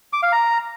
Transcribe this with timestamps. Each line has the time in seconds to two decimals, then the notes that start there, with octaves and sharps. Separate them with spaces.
0.13 D6
0.23 F5
0.32 A#5